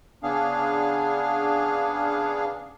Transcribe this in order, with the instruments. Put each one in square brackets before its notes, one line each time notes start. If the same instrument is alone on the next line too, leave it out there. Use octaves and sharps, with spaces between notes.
[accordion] C#3 B3 D4 G#4 F5